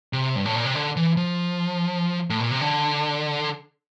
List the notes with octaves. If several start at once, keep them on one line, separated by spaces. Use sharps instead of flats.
C3
G2
A2
A#2
C3
D3
E3
F3
A2
A#2
C3
D3